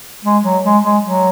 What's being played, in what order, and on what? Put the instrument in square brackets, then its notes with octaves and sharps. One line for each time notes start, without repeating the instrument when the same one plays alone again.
[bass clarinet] G#3
F#3
G#3
G#3
F#3